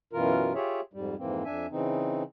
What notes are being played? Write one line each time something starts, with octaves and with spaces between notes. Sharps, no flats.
F#2 B2 E3 F4 A#4
F4 G4 G#4 C#5 E5
F2 G#2 G3
F2 G#2 E3 A#3 C4
F2 D4 E5 G#5
C#3 E3 C4 D#4